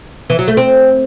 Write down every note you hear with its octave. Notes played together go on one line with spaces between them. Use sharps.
E3
F#3
A3
C4